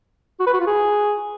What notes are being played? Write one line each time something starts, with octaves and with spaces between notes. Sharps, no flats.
F#4
B4
F#4
F4
G#4